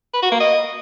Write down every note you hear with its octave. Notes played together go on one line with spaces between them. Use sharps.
B4
F#4
A#3
D#5